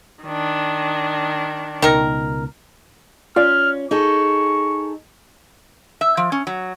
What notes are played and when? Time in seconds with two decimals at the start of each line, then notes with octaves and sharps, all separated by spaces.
0.24 D#3 D4
1.82 C#2 B2 D#3 A#4
3.36 C#4 F4 D5 F6
3.91 D#4 G#4 A4 C#6
6.01 E5
6.17 F3
6.32 C#4
6.47 F#3